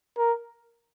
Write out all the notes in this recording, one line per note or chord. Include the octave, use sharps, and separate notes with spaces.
A#4